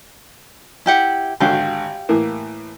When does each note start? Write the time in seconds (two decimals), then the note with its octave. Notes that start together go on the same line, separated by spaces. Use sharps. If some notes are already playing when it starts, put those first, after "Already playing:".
0.86 E4 G4 F#5
1.40 G#1 D3 F#4 G4 F5
2.09 A2 E3 A#3